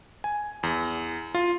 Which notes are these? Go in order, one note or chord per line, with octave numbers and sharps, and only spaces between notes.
G#5
E2
F4